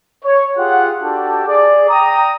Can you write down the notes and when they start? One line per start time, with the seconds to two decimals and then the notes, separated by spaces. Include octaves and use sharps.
0.24 C#5
0.57 F4 G4 G#4 F#5
1.02 D4 F#4 G4 A4 G5 A5
1.47 G#4 D5
1.89 G5 A#5 D#6